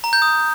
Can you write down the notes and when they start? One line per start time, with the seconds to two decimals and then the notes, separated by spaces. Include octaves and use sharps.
0.04 A#5
0.13 G6
0.22 D#6